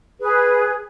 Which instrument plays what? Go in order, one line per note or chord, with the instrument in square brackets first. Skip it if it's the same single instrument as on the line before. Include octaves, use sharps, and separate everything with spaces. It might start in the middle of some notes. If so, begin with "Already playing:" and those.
[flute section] G#4 B4